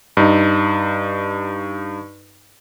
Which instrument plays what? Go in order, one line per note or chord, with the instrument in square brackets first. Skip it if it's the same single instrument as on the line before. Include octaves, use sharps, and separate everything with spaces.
[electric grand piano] G2 D#4